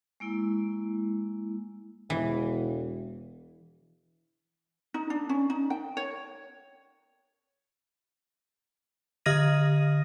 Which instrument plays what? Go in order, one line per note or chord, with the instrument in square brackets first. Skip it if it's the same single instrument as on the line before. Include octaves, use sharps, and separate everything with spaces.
[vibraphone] G#3 A#3 E4
[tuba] E1 [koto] E3
[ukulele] D#4
D4
C#4
D#4
G5
C#5
[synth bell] D3 D#5 D#6 F6 A#6 D#7